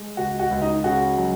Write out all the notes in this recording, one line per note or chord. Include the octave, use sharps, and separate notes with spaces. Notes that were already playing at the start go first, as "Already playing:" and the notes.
Already playing: G#3
C#2 F#4
F#4
C#2
D#4
C#3 F#4
F#3